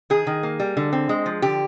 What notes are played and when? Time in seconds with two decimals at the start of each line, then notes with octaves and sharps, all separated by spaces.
0.10 D#3 G#4
0.27 D#3
0.43 A#3
0.60 G3
0.77 D3
0.93 C4
1.09 G#3
1.26 F3
1.42 D3 G4